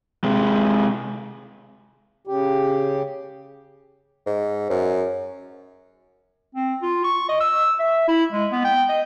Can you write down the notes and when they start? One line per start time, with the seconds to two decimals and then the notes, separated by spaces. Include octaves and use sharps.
0.24 C3 G#3
2.27 C#3 G4
4.26 G#2
4.70 F#2
6.55 C4
6.82 F4
7.04 C#6
7.29 D#5
7.40 E6
7.80 E5
8.08 E4
8.32 G#3
8.52 B3
8.65 G5
8.89 D#5